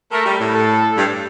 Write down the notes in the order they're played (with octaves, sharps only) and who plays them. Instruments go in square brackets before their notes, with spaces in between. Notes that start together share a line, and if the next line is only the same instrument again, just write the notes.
[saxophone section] A3 [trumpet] A#4
[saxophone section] G3
A2
[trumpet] A4
[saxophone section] G2